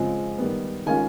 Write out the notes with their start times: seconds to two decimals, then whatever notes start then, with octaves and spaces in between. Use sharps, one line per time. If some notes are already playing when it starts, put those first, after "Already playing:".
Already playing: C#3 F3 G#3 C4 F4
0.38 D#3 G3 B3
0.86 D#3 G#3 C#4 F4 G#5